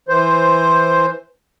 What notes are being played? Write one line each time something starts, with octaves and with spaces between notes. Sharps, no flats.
E3 C5